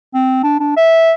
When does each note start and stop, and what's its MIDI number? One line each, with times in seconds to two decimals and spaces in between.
0.14 0.40 60
0.43 0.57 62
0.60 0.75 62
0.77 1.13 76